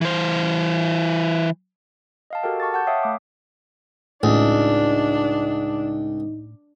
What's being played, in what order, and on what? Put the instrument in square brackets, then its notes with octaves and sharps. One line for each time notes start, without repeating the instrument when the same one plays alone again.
[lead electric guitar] E3 C5
[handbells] D#5 F5 A5
F#4 G4 A4 A#4 G5
A5 C#6 D6 A6
F#5 A5 G6
C#5 E5 F5 G5 D#6
A3 D6 D#6
[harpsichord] C#2 [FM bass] A2 [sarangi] D4 [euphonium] D#4